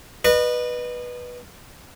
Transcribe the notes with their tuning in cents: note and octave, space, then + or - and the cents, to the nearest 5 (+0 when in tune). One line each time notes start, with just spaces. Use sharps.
B4 -10 D#5 -35